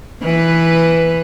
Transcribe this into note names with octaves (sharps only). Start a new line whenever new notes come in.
E3 B4